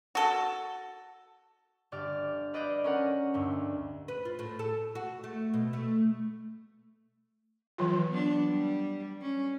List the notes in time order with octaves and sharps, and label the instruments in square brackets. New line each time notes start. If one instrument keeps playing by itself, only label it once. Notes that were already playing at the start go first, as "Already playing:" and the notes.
[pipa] F#4 A4
[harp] G1 G4 D5 F6
B4 D5 D#5 F5 F#6 G6
C#4 A#4 F#5
D2 G2
[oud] B4
F4
A2
A4
F#4
A3
B2
A3
[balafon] E3 F#3 F4
[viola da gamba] B3 D4
G3
C#4